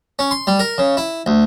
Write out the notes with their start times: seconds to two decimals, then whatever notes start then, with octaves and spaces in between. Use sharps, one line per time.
0.19 C#4
0.31 C6
0.47 G3
0.59 A#4
0.78 C#3
0.97 E4
1.26 D2